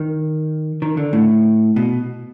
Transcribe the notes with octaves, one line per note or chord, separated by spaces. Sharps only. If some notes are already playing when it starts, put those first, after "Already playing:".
Already playing: D#3
D#3
D3
A2
B2